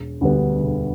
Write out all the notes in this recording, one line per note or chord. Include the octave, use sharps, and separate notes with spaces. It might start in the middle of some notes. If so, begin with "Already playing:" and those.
Already playing: E1
D2 D3 G3 B3
E1